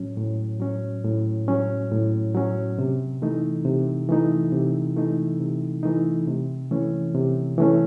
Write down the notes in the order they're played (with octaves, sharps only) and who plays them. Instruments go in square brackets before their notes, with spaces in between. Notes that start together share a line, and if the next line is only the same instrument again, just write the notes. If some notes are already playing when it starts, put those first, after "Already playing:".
Already playing: [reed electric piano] A2 F#3 C#4
A2
F#3 C#4
A2
F#3 C#4
A2
F#3 C#4
C3
E3 A3 D#4
C3
E3 A3 D#4
C3
E3 A3 D#4
C3
E3 A3 D#4
C3
E3 A3 C#4
C3
E3 A3 C#4